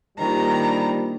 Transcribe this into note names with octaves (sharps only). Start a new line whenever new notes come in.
D#3 G3 A#3 D4 F4 C5 A#5